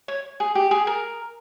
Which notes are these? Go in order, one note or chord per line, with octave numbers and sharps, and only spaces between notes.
C#5
G#4
G4
G#4
A#4